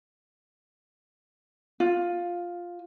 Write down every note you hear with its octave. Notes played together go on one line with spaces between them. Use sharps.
F4